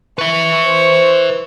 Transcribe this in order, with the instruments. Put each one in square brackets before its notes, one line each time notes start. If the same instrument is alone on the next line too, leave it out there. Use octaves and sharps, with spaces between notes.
[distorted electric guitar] B4 E5 [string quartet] C#6
[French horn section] C5